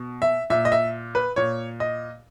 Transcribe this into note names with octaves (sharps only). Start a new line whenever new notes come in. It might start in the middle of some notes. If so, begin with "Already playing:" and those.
Already playing: B2
E5
A#2 E5
D#5
E5
B4
A#2 C#5
D#5